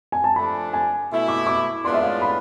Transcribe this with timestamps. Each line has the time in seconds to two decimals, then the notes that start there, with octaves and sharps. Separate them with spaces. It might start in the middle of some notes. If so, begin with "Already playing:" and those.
0.12 G#5
0.24 A5
0.36 F3 A3 D4 B5
0.73 G#5
1.10 B2 A3 E4
1.28 D6
1.47 D6
1.84 A2 G#3 B3 D4 F4 C6
1.94 E5
2.02 F5
2.22 B5